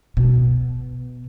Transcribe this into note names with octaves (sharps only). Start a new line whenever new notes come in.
B2